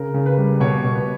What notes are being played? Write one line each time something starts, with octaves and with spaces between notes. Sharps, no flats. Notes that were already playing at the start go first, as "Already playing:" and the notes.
Already playing: C#3 A#4
C#3
B4
G3
B4
B2 C#5
B2
B4